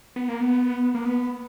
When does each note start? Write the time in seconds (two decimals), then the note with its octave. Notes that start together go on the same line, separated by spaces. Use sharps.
0.16 B3
0.29 A#3
0.40 B3
0.95 A#3
1.05 B3